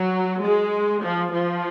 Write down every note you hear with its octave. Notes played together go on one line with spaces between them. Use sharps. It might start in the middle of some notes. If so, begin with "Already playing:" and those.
Already playing: F#3
G#3
F3
F3